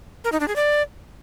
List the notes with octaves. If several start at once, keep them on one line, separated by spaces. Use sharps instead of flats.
A#4
D#4
D4
G#4
D5